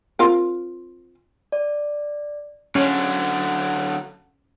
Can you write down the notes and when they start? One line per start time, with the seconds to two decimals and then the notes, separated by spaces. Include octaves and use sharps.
0.19 C4 F4 A#4
1.52 D5
2.75 D3 F#3 C#4